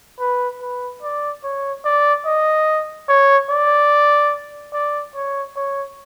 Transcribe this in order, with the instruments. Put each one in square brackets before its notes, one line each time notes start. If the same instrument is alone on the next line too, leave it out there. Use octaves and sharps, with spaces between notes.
[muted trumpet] B4
B4
D5
C#5
D5
D#5
C#5
D5
D5
C#5
C#5